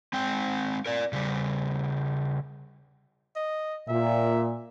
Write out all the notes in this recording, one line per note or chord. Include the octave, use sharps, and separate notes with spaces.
G#3 C4 G5
A#4 D5
C#3 G3
D#5
A#2 E5